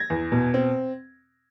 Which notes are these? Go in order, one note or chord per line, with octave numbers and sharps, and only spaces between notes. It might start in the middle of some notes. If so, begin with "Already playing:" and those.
Already playing: G#6 A#6
E2
B2
C4